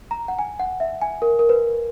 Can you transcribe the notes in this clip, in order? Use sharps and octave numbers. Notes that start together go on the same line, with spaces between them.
A#5
F#5
G#5
F#5
E5
G#5
A#4
A#4
B4